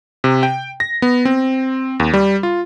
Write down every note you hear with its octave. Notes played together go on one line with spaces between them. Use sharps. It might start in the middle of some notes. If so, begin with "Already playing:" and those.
C3
G5
A#6
B3
C4
D#2
G3
F4